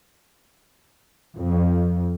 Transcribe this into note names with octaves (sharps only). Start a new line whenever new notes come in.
F2